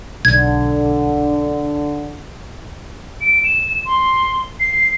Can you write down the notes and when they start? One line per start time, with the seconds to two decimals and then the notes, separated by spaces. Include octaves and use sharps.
0.25 B1 D3 G#6
3.21 D7
3.44 E7
3.86 C6
4.60 C7